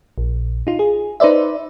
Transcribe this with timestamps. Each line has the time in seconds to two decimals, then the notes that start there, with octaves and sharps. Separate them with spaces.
0.18 A#1
0.67 D#4 F4
0.79 G#4
1.20 D#4 B4 C5 D5 E5